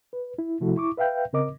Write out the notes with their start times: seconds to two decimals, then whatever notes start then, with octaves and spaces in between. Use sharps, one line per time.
0.13 B4
0.38 E4
0.60 C3 F3 A3 E4 F#4 A4
0.76 E4 C#6 D6
0.97 B4 E5 F5 G5 G6
1.33 C#3 C4 A#4 D#5 D6